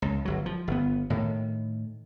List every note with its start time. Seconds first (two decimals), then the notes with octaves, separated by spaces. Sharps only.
0.02 C#2
0.25 G1 F#3
0.46 F3
0.68 G1 B3
1.10 A2 D#3